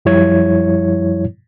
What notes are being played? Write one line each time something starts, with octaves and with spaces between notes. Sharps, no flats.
F#2 F3 G3 E4 C#5 G#6